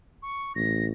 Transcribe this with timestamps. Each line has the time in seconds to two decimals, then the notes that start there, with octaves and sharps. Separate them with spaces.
0.23 C#6
0.55 A1 A#6